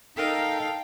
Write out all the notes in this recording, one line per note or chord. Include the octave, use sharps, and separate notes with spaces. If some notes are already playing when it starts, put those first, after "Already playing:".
D#4 A4 A#4 D#5 F5 G5